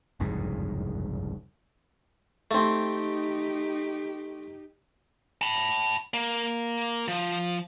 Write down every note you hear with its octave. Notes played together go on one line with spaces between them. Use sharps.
F#1 C2 F2 G#2
A3 C4 D#4 G4
A5 B5
A#3
F3